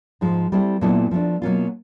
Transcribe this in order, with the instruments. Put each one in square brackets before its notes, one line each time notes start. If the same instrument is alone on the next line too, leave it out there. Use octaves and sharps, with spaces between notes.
[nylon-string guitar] G#2 F3 G#3
G3 C4 E4 A4
A#2 F#3 B3 E4 A4
F3 A3 D4
B2 F#3 A#3 C#4 F4